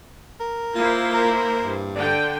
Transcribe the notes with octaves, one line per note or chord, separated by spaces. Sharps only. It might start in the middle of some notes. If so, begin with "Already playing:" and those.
A#4
A#3 E4 F4 C5
A#4
G2
D3 D5 G5